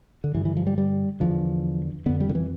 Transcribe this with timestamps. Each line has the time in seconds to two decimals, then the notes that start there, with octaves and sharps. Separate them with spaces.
0.24 D3
0.34 G2 D3 E3
0.45 E3
0.57 F3
0.67 G3
0.78 G3
1.20 E2 D3 F3
2.06 F2 D3 B3
2.20 G3
2.29 D3
2.35 E3